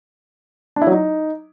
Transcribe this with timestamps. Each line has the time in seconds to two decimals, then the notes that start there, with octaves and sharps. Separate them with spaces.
0.76 D4
0.82 E4
0.87 F#3
0.92 D#4